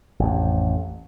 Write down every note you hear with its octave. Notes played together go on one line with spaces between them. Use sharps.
A1 F2